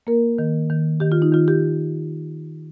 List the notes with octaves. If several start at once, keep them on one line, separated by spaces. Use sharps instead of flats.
A#3 A#4
D#3
D#3
D#3 G4
F4
D#4
D#3 F4
G4